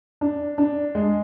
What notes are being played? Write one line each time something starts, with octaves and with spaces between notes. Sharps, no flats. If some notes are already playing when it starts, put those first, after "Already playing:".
D4
D4
G#3